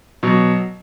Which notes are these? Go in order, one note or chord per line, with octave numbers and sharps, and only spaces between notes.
B2 F#3